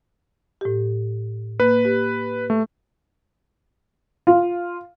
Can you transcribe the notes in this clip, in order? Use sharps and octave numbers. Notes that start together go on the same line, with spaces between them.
A2 G4
A#3 B4
G4
A3
F4